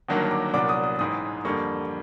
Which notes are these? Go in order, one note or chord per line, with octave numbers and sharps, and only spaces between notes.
G1 G2 D#3 F#3 A#3
D6
C2 A#2 F#3 B3 D4 D6
D#6
D#6
A1 G#2 E3 D#6
F2 D3 G3 A#3 C#6